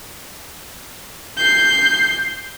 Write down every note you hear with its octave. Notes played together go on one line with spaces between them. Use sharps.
G6 C7